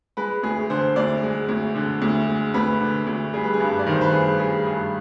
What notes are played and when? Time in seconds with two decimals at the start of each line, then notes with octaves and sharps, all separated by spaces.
0.17 G#3 B4
0.43 D2 G#4
0.70 D3 C5
0.96 D2 D5
1.23 G#3
1.49 D2
1.75 D3
2.02 D2
2.28 G#3
2.54 D2 B4
2.81 D3
3.07 D2
3.33 G3 G#4
3.44 B4
3.54 G#4
3.60 G2
3.79 D5
3.86 D#3 C5
4.01 B4
4.12 G2 G#4
4.39 G3 G#4
4.65 G2 G#4